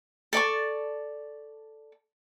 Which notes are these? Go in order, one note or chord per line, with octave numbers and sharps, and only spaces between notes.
A4 D5 A5 C#6